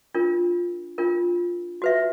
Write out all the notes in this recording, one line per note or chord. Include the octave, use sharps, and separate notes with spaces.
D4 F4 A#4
D4 F4 A#4
F#4 B4 E5